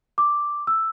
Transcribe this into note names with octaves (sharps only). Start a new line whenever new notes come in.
D6
E6